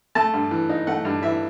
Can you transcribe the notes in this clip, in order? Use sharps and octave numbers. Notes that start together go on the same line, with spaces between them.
A3 A5
G2
E3
D#4
A3 F#5
G2
E3 E5